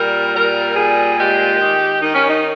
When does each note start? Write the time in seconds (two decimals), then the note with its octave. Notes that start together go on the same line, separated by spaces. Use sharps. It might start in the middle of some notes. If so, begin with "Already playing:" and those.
Already playing: A#2 G3 A#4
0.35 G3 A#4
0.76 A#2 G#4
1.19 G#3 G4
1.61 D#3
2.02 D#3 D#4
2.14 C#4
2.28 D#4